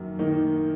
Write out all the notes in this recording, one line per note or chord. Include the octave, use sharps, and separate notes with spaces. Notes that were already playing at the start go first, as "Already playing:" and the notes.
Already playing: F#2 D#3 A#3
D#3 A#3 D#4